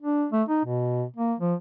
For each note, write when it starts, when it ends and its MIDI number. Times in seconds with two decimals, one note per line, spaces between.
0.02 0.26 62
0.32 0.43 57
0.49 0.61 63
0.65 1.05 47
1.16 1.34 58
1.40 1.54 53